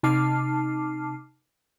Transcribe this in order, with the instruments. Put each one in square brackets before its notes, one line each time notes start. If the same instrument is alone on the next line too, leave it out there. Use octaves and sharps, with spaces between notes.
[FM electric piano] C3 D#4 A5 D6 F6 C7